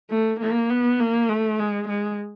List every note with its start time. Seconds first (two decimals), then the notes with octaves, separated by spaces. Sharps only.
0.10 A3
0.40 A#3
0.70 B3
1.00 A#3
1.29 A3
1.59 G#3
1.88 G#3